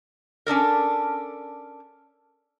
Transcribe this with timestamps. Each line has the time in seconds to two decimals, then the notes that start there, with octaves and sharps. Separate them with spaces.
0.46 C#4 D4 A4 A#4